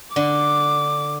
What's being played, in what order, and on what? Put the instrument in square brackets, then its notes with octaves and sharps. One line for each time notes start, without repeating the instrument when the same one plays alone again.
[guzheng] D3 [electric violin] D6